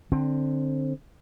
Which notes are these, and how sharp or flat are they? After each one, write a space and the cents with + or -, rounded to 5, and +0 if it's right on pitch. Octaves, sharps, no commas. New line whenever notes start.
D3 +15 C4 +20